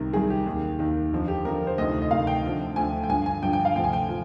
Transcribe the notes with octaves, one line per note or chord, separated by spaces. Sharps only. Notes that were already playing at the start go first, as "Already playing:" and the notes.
Already playing: C2 C3 D#3 A#4
C2 C3 D#3 G#4
G4
D#2 D#3
D#2 D#3
F2 D3 F3
G4
F2 D3 F3 A#4
C5
D2 C3 D#3 D#5
D#5
D2 C3 D#3 F5
G5
D2 D3 F3
D2 D3 F3 G#5
G5
G2 D3 F3 G#5
G#5
G2 D3 F3 G5
G5
F5
D2 C3 F3 G5
G#5
G5
F3